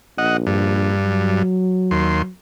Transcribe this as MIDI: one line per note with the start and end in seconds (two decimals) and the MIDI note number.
0.18 0.94 34
0.18 0.37 75
0.18 0.37 78
0.47 1.42 43
1.04 2.30 54
1.91 2.22 39
1.91 2.22 84